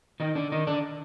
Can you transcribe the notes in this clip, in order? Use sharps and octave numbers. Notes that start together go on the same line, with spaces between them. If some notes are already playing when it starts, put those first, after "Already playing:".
D#3 D#4
D3 D4
D#3 D#4
D3 D4